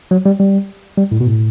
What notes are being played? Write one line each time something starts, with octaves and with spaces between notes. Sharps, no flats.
F#3
G3
G3
G3
A2
B2
A2